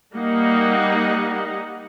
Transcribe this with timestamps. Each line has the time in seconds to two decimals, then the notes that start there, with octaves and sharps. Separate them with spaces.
0.15 G3 A#3 D#4 F#5